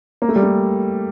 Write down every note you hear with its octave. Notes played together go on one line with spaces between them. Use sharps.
A#3
A3
G3
A3